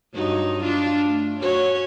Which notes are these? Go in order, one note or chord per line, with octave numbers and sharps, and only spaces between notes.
G2 F#3 D#4
D4 F4
A3
C#4 F#4 C#5